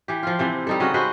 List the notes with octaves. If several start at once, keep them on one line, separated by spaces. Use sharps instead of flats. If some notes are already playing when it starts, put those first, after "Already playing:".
E3 G4
F3 F4
C3 E3 C4
G3 D#4 A4
C#3 F#4 D#5
G#3 F#4 B4 C5